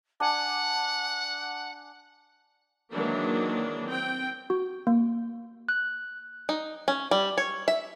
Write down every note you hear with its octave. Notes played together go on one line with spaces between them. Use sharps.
D4 F#5 G#5
D#3 E3 F#3 G#3 A#3 D4
C4 G5
F#4
A#3
F#6
D#4
C#4
G3
C#5
E5